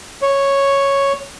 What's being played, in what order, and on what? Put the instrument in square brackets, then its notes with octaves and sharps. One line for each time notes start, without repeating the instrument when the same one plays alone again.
[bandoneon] C#5